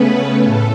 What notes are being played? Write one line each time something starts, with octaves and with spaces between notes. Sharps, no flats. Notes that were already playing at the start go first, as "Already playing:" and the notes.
Already playing: C#3 A3 B3 C#4 B4
A2 A4